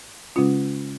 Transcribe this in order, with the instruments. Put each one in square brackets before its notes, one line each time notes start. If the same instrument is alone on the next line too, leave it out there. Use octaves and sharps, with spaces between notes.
[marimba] C#3 G#3 C#4 F4